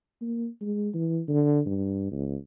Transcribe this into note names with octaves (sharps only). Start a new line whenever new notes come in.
A#3
G#3
E3
D3
G2
C#2